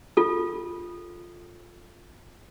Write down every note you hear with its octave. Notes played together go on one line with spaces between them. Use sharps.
F4 A4